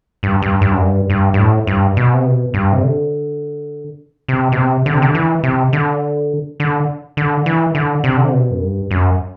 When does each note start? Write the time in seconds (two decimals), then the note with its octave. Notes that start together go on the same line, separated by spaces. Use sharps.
0.23 G2
0.42 G2
0.61 G2
0.71 F#2
0.81 G2
1.10 G2
1.34 G2
1.39 A2
1.67 G2
1.97 B2
2.14 C3
2.26 B2
2.54 G2
2.73 C3
2.83 D3
4.28 C3
4.52 B2
4.57 C3
4.86 D3
4.94 C3
5.02 D3
5.15 E3
5.43 C3
5.73 D3
6.60 D3
7.17 D3
7.46 E3
7.75 D3
8.04 C3
8.17 D3
8.25 C3
8.33 B2
8.51 F#2
8.62 G2
8.91 F#2